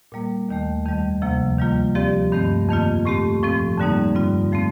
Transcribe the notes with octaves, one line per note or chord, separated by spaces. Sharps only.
A#2 G3 A#3
D#2 D#3 A3
F2 D#3 G3
D2 C3 F3 A#3
D#3 G3 A#3 F4
F3 C4 G4 D5
G2 D#3 A3 C4
F2 D#3 A#3 F4
A2 A3 C4 G4
A2 F3 C4
F2 D3 G3 A#3 D#4
G2 D3 G3 C4 F4
F3 A3 C4